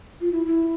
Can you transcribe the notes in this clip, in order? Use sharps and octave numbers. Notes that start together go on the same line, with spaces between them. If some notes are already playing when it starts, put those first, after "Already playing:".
F4
E4
E4